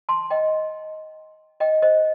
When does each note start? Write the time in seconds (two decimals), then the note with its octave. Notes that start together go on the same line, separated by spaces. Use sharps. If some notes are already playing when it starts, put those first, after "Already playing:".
0.09 A5 C6
0.30 D#5 G5
1.60 D#5 G5
1.82 C5 D#5